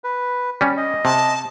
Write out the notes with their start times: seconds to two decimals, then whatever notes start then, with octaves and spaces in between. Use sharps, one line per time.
0.04 B4
0.61 G3 C#4
0.77 D#5
1.05 C3 A5